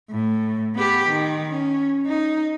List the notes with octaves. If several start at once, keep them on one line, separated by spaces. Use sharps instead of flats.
A2
B3 G4
D#3
C#4
D#4